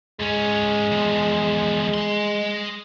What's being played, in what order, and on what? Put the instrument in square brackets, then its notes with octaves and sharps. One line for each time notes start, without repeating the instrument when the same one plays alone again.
[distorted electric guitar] G#2 C#4 [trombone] G#3
[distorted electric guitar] E2 F3
D#5 C6